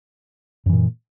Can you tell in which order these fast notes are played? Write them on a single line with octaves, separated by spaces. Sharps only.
F#2 E3 A#2